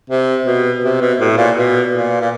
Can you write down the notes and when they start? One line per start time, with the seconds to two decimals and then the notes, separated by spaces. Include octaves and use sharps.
0.10 C3
0.46 B2
0.84 C3
1.01 B2
1.20 A2
1.37 A#2
1.56 B2
1.92 A#2
2.21 A#2